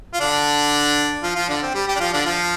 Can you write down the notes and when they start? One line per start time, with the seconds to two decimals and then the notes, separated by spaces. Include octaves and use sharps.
0.14 F4
0.20 D3 D4
1.23 F3 F4
1.36 F3 F4
1.49 D3 D4
1.62 C4
1.74 G3
1.87 G3 G4
1.96 D4
2.00 F3 F4
2.13 D3 D4
2.26 F3 F4